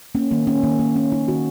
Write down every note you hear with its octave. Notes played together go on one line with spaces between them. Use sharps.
A#3 C#4
D#3 A#3
A#3 C#4
D#3 A#3
A#3
D#3 C#4
A#3 D#4
D#3 F#4